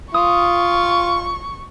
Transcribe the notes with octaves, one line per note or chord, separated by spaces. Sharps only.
F4 C#6 D#6